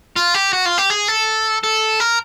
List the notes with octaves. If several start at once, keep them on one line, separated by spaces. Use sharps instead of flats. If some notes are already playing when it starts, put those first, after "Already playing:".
F4
G4
F#4
F4
G4
G#4
A4
A4
A#4